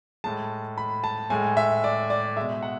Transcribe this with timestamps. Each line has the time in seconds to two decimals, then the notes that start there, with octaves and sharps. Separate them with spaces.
0.24 A2 G#3 A5
0.78 B5
1.04 A5
1.30 A2 G#3 G#5
1.57 E5
1.84 D5
2.10 D5
2.36 G#3 E5
2.41 B2
2.63 F#5